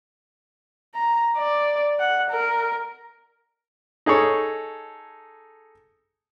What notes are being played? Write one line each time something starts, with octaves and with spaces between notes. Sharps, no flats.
A#5
D5
F#5
A#4
D#4 G#4 A4 C#5